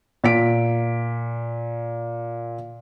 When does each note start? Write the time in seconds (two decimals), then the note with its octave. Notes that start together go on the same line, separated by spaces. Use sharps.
0.24 A#2 B6 D7